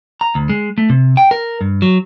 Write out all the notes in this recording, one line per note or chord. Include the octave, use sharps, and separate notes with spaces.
A#5
D2
G#3
A3
C3
G5
A#4
G2
F#3